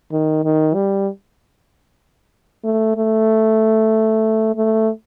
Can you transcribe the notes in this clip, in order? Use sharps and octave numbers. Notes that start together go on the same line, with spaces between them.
D#3
D#3
G3
A3
A3
A3